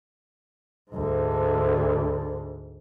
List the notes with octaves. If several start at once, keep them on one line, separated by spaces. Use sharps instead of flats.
D2 G#2